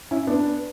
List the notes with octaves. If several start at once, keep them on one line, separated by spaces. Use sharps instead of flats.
C#4 E4
B3 D4